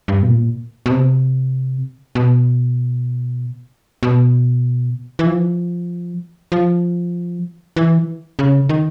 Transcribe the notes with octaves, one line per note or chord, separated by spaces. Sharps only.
G2
B2
A#2
B2
C3
B2
B2
E3
F3
F3
E3
C#3
D#3